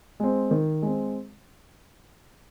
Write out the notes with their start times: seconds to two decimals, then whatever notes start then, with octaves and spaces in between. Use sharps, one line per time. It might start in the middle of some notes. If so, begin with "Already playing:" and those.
0.20 G#3 C4
0.51 D#3
0.82 G#3 C4